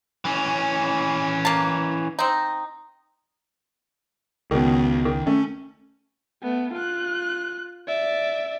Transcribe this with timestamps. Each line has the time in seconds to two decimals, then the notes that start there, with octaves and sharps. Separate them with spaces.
0.25 E3 C#4
1.45 A#3 A5
2.19 C4 D#4
4.51 C#2 B2 D#3
5.05 D#3
5.27 A3 C#4
6.43 A3 B3
6.74 F4 F#6
7.88 D5 E5